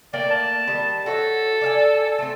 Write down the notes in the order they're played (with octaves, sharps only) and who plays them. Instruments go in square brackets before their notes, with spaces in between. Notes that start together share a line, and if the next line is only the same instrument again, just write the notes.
[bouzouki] A3 A#3 G5 [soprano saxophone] D5
[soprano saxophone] A5
[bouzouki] D#3 G3
[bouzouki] F#4 C#5 E5 [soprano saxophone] A4
[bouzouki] D5 F5 G#5
[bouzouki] A3 C4 [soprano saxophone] A4